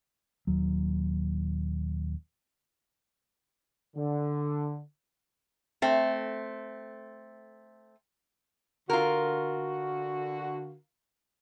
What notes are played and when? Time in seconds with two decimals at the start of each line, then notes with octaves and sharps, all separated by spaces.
0.47 D#1 D#2 F#3
3.96 D3
5.82 A3 C4
8.90 D3 F4 F#4 A#4